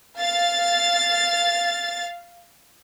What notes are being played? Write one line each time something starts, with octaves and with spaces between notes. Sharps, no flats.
F5 A6